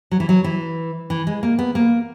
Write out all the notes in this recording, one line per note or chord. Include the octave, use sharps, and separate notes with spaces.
F#3
E3
F#3
E3
E3
G#3
A#3
B3
A#3